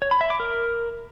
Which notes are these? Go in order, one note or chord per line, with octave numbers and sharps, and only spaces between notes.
C#5
B5
E5
D6
A#4